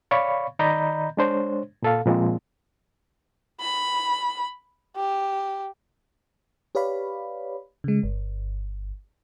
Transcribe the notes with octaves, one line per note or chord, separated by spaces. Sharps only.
C#5 D5 F5 B5 C#6
D#3 D5 D#5 A#5 B5 G6
G#3 D4 C5 C#5
A#2 A4 F5
A#2 F3 G#3 C4
B5
G4
G4 B4 C#5 D5 F5 B5
C#3 G#3
G1